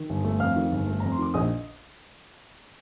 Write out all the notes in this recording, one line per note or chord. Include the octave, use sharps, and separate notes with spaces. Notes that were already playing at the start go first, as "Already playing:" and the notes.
Already playing: D#3
G1
A3
F2 F5 F6
D#3
G1
A3
F2 A#5
C6
D#3 D6
A#1 D#5 D#6